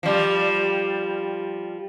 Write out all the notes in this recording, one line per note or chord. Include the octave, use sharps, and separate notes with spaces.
F3 G3